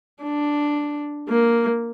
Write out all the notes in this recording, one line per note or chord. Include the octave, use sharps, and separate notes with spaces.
D4
A#3